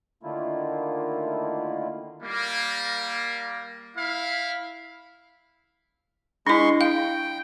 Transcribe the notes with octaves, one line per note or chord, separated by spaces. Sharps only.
D3 D#3 A3 A#3 E4 F4
G3 A#3
E4 F5
G#3 D4 E4 C6 C#6
F5 G5